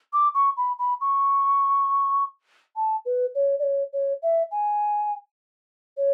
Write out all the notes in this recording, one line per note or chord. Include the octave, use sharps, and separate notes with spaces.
D6
C#6
B5
B5
C#6
A5
B4
C#5
D5
C#5
C#5
E5
G#5
C#5